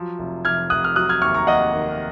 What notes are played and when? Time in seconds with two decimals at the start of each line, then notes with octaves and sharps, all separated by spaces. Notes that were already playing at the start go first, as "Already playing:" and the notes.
Already playing: F3 F#3
0.19 F1
0.45 F1 F6 G#6
0.70 F1 D#6 F#6
0.84 F6
0.96 F#3 D#6 F#6
1.09 F6 G#6
1.21 D#2 C#6 F6
1.34 A#5 C#6
1.47 D#2 D#5 F#5
1.73 D#3